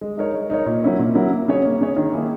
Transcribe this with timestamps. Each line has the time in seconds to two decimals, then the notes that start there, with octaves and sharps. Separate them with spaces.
0.01 G#3
0.17 D#4 A#4 C#5
0.34 G#3
0.50 D#4 A#4 C#5
0.66 A#2
0.82 F#3 C#4 E4 A#4
0.99 A#2
1.15 F#3 C#4 E4 A#4
1.32 A#3
1.48 C#4 G#4 C#5
1.64 A#3
1.81 C#4 G#4 C#5
1.96 D#3
2.13 A#3 E4 G#4